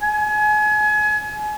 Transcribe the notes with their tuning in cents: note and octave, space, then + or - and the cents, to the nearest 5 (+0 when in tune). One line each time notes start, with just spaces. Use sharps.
G#5 +30